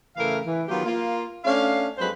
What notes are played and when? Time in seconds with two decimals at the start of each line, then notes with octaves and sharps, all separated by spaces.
0.17 A2 C#3 E3 A#4 E5 F5
0.45 E3
0.68 D#3 F#3 B3 F4 G4
0.85 A#3 F4
1.45 A3 C#4 D4 F5
1.98 F2 F#3 G#3 B4 C5